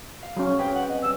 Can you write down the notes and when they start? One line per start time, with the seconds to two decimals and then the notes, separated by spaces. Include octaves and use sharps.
0.23 F5
0.37 F#3 C#4
0.59 C4 G#4 B4 G5
0.75 F#5
0.89 D#5
1.02 G3 C#4 E6